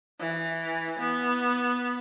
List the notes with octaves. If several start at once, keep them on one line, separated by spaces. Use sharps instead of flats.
E3
B3